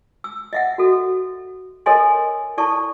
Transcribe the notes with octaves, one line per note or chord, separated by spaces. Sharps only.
E6
D#5 E5 F#5
F#4 A4
A4 A#4 C#5 D#5 G#5 C6
E4 A4 D5 A5 C#6